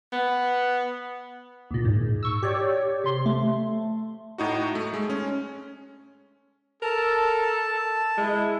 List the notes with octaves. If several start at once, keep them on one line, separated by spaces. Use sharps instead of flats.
B3
D#2 A#2
G#2
C#6 E6
G4 C#5 D5
C3 C6
A3
A2 D#4 F#4
A3
G#3
C#4
A4 A#4 A5
G#3 E4